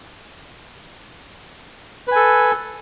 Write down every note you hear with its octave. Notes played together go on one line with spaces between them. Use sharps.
A4 B4 G#5